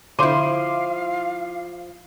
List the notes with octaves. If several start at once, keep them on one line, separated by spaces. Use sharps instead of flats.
D3 F3 E4 C5 F5 C6 D6 D#7